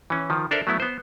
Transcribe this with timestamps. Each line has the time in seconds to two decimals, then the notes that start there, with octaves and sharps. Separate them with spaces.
0.10 E3 C#4
0.30 D#3 F3
0.51 D4 A4 A#4 C5 D5 E5
0.67 F#3 A3 B3 E4
0.80 B3 C5